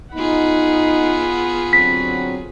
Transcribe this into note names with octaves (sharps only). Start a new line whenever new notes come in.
B3 D#4 F4 G#4 F#5 B5
D3 F#3 C4 B6